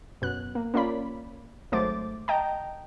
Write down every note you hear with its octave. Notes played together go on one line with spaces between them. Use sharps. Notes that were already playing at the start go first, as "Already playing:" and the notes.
F#2 B2 F#6
A#3
A#3 C#4 F4 D5 B5
G#1 F#3 A3 C5 D6 A6
D#5 G5 A5 A#5